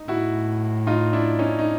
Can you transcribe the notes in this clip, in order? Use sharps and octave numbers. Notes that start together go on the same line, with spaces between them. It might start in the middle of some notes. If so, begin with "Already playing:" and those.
Already playing: D#4
A2 E4 F#4
D#4 F4
D4 E4
C#4 D#4
D#4